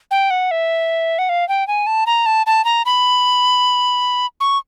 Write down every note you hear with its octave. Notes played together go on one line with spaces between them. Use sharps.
G5
F#5
E5
F#5
F5
G5
G#5
A5
A#5
A5
A5
A#5
B5
C#6